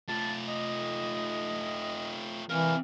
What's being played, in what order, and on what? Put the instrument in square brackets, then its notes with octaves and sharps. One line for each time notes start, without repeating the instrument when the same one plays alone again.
[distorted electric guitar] A3 F4 [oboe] A5
[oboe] D#5
[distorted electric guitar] C3 A#4 [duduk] E3 [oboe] F5